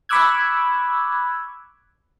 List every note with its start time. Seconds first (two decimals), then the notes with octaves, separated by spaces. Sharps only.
0.09 B5 C#6 D6 E6 F#6 G#6